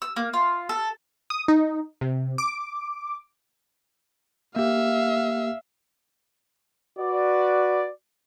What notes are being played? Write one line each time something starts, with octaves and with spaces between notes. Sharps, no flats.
E6
A#3
F4
A4
D#6
D#4
C3
D6
A#3 G4 E5 F5
F#4 B4 D5